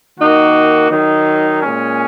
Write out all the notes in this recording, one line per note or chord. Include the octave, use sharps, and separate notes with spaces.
D#3 A#3 D#4 F#4
D#3 F#3 D#4
A#2 G#3 C#4